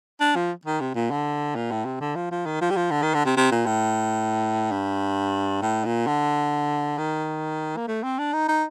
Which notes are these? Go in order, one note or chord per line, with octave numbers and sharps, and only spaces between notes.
D4
F3
D#3
C3
A#2
D3
A#2
A2
C3
D3
F3
F3
D#3
F3
G3
F3
D3
D#3
D3
C3
C3
A#2
A2
G2
A2
A#2
D3
D#3
A#3
A3
C4
D4
D#4
D#4